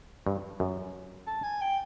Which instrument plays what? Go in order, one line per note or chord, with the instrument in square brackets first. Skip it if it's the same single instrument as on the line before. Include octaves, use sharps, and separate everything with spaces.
[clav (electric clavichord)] G2
F#2
[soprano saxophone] A5
G#5
G5